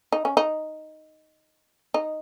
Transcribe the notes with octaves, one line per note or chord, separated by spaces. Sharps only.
D#4
C#4
D#4
D#4